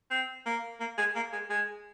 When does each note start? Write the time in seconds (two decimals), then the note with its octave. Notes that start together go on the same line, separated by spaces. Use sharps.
0.10 C4
0.46 A#3
0.80 A#3
0.98 G#3
1.15 A#3
1.32 G#3
1.50 G#3